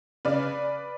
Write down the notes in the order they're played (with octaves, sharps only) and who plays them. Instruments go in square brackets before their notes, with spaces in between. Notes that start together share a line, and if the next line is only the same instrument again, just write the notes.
[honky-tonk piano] C#3 B4 D5